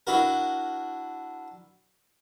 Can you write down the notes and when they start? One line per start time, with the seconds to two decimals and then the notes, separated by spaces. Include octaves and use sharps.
0.07 D4 E4 F#4 A#4